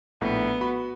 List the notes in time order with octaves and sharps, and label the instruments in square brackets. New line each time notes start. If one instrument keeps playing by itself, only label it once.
[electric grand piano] A#1 A2 [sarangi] B3
[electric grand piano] F#4 B5